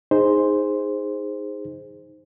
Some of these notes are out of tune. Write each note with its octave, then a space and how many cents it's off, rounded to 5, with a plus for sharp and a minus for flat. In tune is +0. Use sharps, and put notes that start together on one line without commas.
D#4 +5 G#4 -15 C5 +0